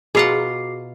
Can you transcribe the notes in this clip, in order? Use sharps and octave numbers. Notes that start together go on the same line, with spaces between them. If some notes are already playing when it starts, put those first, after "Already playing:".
B2 F4 F#4 G#4 F#5 A#5 D6 C7